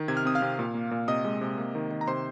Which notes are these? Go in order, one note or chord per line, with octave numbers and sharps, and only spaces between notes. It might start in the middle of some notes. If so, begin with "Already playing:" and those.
Already playing: D#3
C3 G#6
F6
C4 D#6
F5 F6
C3
A#2
A#3
A#2
C3 D#5 D#6
G#3
C3
A#3
D#3
D#3
A#5
C3 C5 C6